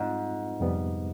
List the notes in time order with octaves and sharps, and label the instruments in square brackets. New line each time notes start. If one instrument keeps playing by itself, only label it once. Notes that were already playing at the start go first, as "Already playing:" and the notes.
Already playing: [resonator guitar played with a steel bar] G#2 [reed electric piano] G3 C4 F4
[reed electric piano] F2 C3 G3 B3